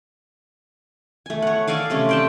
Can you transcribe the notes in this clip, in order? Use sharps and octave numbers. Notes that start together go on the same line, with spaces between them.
A3 G#5
C#5 F#5
A4 D5 F5 G#5
C3 A3 C#4
D5 G5 A5